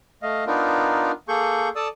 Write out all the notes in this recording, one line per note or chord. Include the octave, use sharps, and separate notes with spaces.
A3 D#5 F5
B3 D4 D#4 F4 A#4
A#3 G#4 A4 C#6 G6
A4 D5 A5 D#6 E6